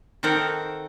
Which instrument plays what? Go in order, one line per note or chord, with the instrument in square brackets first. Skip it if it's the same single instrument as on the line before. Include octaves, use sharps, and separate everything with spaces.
[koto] D#3 C4 A4 A#4 F#5